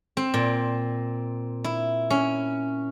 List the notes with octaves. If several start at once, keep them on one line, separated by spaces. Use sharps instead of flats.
C4
A#2
E4
C#4